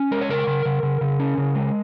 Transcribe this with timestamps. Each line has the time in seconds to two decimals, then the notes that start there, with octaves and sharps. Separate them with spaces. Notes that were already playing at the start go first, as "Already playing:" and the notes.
Already playing: C#4
0.11 G#3 A#4
0.21 C#5
0.29 C#3 A#4
0.47 C#3
0.65 C#3
0.83 C#3
1.01 C#3
1.20 C#4
1.38 C#3
1.55 G#3